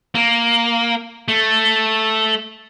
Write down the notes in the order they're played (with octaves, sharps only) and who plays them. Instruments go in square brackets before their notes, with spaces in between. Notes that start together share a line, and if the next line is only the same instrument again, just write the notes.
[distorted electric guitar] A#3
A3